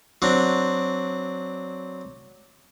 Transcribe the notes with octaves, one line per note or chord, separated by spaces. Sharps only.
F#3 C4 D4